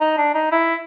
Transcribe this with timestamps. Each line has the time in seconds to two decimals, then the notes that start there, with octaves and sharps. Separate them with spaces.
0.01 D#4
0.18 D4
0.34 D#4
0.52 E4